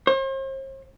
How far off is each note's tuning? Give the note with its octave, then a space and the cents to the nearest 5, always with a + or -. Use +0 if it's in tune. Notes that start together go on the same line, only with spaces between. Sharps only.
C5 +45